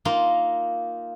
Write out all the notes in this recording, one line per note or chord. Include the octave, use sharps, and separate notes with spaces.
A#3 D#4 F4